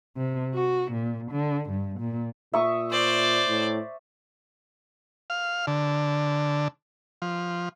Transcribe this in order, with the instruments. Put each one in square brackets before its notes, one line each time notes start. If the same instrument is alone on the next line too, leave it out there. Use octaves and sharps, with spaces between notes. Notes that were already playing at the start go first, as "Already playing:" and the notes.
[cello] C3
F#4
A#2
D3
G2
A#2
[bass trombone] A#2 [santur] E5 C#6 D#6
[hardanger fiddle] C5 D5
[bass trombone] A2
[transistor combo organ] F5
D3
F3